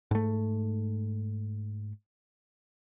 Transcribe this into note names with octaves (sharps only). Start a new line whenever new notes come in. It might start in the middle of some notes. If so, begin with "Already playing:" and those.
G#2 A3